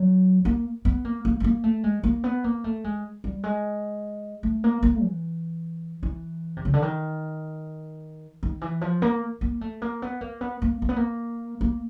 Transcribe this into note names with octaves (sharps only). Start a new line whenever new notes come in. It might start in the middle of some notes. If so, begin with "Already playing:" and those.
Already playing: F#3
A#3
B3
A#3
A#3
A3
A#3
A3
G#3
A#3
B3
A#3
A3
G#3
G3
G#3
A3
A#3
A#3
E3
E3
C3
C#3
D3
D#3
D#3
E3
F3
A#3
A#3
A3
A#3
B3
A#3
B3
A#3
A#3
B3
A#3
A#3